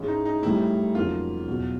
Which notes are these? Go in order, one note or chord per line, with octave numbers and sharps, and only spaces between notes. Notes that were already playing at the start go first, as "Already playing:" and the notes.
Already playing: G#2 E3 G#3 C#4
D#4
D#4
A2 E3 G3 E4
F2 C#3 F#3 A#3 D#4 F4
E2 B2 F#3